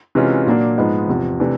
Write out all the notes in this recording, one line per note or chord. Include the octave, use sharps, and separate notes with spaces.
C3 E3 G#3 C#4 F4
A#2 F#3 A#3 D4
G#2 F3 G#3 B3 D#4
E2 C3 F3
C3 E3 A3 D4